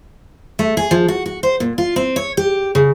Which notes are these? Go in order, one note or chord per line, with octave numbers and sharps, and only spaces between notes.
A3
G#4
F3
F#4
F#4
C5
A#2
F4
C4
C#5
G4
C#3